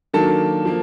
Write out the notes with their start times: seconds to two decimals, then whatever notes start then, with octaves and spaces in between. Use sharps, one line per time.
0.14 D#3 F#3 A#3 D4 A4 A5
0.65 F3 A#3